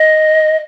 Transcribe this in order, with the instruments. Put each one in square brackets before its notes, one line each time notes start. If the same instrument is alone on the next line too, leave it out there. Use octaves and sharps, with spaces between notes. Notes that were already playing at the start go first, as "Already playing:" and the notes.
Already playing: [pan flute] D#5